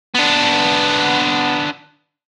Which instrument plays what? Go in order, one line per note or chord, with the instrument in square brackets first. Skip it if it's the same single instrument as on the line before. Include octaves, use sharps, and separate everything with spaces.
[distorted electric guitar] B3 D4